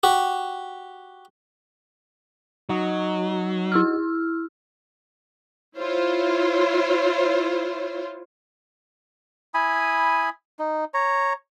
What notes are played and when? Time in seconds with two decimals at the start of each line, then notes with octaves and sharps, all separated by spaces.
0.03 F#4 G4
2.69 F#3 D#4 F#4 D#5
3.72 E4 E6 F6
5.78 E4 F4 C5 C#5
9.54 E4 G#5 B5 D#6
10.59 D#4
10.94 C#5 A#5